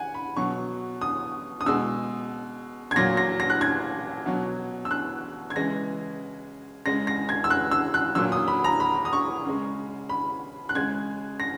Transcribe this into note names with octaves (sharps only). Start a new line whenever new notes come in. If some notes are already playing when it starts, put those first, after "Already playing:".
Already playing: F#5 G#5
B5
B2 F#3 C#6
D#6
D#6
B2 G#3 E6
G#6
A#2 F#3 A#6
A#6
A#6
F#6
G#6
B2 F#3
E6
F#6
G#6
C#3 E3 G#3 A#6
C#3 G#3 A#6
A#6
G#6
E6
F#6
E6
F#6
A#2 F#3 E6
D#6
B5
A#5
B5
D#6
C#6
C#3 G#3
B5
F#6
C#3 G#3 G#6
A#6